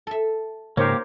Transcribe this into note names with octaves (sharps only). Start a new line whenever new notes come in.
A4 E5
G#2 C#3 A#3 D#4 G4 A#4 C5 C#5